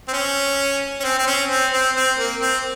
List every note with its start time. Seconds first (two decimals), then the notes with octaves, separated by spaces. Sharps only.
0.08 C4
0.13 C#4
1.00 C#4
1.04 C4
1.19 C4
1.27 C#4
1.50 C4
1.73 C4
1.95 C4
2.18 A#3
2.41 C4